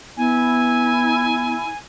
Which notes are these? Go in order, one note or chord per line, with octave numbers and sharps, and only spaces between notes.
B3 E4 G#5